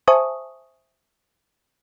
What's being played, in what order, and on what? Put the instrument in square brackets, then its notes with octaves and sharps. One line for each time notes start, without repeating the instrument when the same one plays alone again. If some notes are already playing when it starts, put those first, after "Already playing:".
[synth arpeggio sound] C5 E5 G#5 A5 C#6 D#6